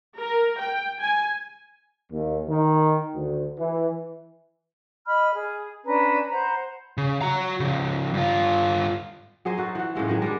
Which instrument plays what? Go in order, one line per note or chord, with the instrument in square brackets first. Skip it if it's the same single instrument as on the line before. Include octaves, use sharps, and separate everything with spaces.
[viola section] A#4
G5
G#5
[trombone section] D#2
D#3
D2
E3
[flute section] D#5 B5 F6
G#4
C#4 D4 B4 A#5
C5 F#5 A#5 B5
[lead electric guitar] C#3
F#4 A#5
C#3 F3
G2 F4
[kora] F#3 G#4 C5 D#5
D#4 F#4 A4
E3 F#4
A2 C#3 G#3 A3
D#3 F#3 G#3
G3 G#3 D4